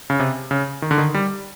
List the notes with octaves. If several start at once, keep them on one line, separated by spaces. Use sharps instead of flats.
C#3
C3
C#3
D#3
D3
D#3
G3